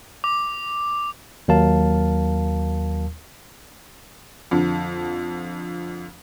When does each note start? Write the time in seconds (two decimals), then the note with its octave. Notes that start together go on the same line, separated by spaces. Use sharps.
0.24 D6
1.48 D#2 F#3 A#4 F5 A5
4.51 F2 D3